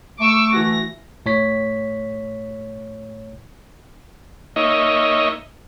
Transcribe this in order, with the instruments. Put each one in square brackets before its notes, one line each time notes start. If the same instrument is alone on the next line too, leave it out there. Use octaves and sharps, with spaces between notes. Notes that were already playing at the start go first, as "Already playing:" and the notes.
[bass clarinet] A3 [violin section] C#6 D6 E6
[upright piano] E3 F#4 [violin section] A#6
[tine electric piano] A2 C#5 B6
[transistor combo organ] A#3 D#4 C#5 D#5 E5